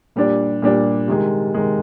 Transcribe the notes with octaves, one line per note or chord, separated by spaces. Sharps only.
A#2 G3 D4
A#2 G3 D4
C3 D#3 G#3
C3 D#3 G#3